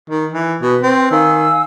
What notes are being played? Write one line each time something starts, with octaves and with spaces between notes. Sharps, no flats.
D#3
E3
B2 B4
C4
D#3 F5 G#5 E6